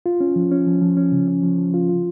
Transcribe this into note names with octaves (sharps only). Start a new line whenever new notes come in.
F4
C#4
F3
C#4
F3
F3
C#4
C#3
C#4
F3
F3
F4
F4